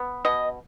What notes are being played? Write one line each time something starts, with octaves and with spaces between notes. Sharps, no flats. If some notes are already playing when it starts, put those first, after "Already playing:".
Already playing: B3
B2 D#5